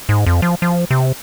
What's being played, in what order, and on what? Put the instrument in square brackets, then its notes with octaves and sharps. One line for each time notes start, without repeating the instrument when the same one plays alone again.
[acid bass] G#2
F2
F3
F3
C3